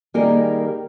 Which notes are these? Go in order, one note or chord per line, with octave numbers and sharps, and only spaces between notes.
D#3 G3 A#3 D#4 G#4 A#4